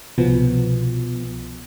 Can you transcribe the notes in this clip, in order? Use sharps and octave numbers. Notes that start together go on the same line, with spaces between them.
C2 B2 F3 B3